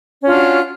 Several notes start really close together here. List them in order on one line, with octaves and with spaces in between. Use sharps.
C#4 F4 D4 F#4